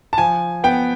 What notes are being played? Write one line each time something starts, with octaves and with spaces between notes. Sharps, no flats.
A5
F3 G#5
B3 G5